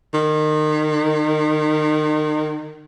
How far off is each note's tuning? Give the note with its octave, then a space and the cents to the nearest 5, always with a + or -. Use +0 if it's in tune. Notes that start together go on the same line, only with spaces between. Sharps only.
D#3 -30